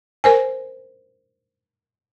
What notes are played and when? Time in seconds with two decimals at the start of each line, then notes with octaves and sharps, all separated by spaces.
0.24 A#4 C5 G#5